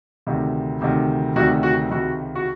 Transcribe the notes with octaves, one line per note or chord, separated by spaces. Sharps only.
D2 C3 D#3
D2 C3 D#3
D2 C3 D#3 F#4
F#4
C#2 C3 D#3 F#4
F#4